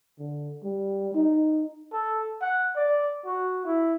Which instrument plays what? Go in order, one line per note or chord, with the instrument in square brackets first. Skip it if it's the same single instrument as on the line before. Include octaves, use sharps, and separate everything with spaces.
[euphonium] D3
G3
D#4
[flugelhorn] A4
F#5
D5
F#4
E4